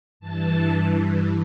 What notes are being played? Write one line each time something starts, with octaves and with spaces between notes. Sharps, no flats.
G2 E3 A5